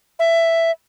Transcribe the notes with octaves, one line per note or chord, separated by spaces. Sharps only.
E5